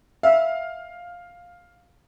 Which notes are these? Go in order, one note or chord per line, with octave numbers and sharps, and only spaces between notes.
E5 F5